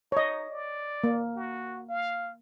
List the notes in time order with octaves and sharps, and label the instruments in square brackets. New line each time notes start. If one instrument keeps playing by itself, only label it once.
[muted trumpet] D#4 [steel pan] C#5 D#5
[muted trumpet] D5
[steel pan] A#3
[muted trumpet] F#4
F5